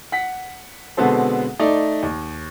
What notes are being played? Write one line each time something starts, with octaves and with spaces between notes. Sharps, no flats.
F#5 B6
B2 D3 G#3 B3 C4 A4
A3 D#4 D5
D#2